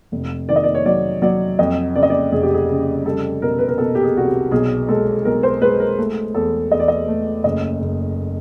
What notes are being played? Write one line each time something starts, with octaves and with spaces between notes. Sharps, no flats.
F1
D#3 D5
D#5
D5
C#5
F#3 D5
F#3 D5
F2 D#5
C#3 D5
D#5
D5
F1 G#4
G4
G#4
C#3
G3 A4
B2 A#4
B4
A#4
B2 A4
G4
G#4
C2 F#4
G4
B1 G#4
G#3 A4
B1 A#4
C5
G#3 B4
A#4
A3
E2 A4
E2 D#5
D5
D#5
A3
F#1 D#5
F#1